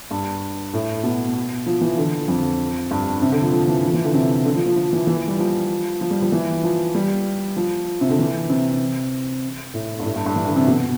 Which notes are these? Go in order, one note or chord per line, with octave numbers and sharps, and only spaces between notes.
G2
A2
B2
F3
E3
D3
F2
G2
C3
D3
F3
F3
E3
F3
E3
D3
C3
D3
F3
F3
F3
E3
E3
G3
F3
F3
G3
F3
E3
F3
G3
F3
C3
D3
E3
C3
A2
G2
A2
G2
G2
E3
D3
C3
B2